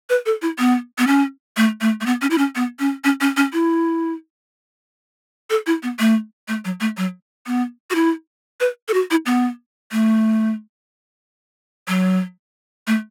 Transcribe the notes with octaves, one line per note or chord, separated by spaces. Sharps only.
B4
A4
E4
B3
B3
C#4
A3
A3
A3
B3
C#4
E4
C#4
B3
C#4
C#4
C#4
C#4
E4
A4
E4
B3
A3
A3
F#3
A3
F#3
B3
F#4
E4
B4
A4
F#4
E4
B3
A3
F#3
A3